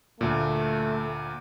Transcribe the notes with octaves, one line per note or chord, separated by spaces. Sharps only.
D2 A#2 A3